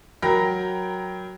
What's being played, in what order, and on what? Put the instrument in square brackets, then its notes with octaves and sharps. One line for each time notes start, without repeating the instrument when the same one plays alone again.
[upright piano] F#3 A#4 G5 A#5 B5 A#6